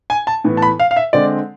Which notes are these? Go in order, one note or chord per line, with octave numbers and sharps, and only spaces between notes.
G#5
A5
A2 E3 B3
A5
B5
F5
F5
E5
D3 G#3 C4 D5